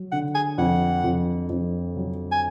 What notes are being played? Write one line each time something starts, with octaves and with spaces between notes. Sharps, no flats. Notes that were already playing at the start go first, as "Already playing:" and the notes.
Already playing: F#3
D3 F#5
G#5
F2 F#5
F2
F2
F#3
G#5